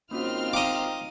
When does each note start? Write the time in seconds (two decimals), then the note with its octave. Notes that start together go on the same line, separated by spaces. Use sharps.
0.11 G#1 A#3 C4 C#4 D#4 F4 F#4 F6
0.53 D#5 F5 G5 A#5 D6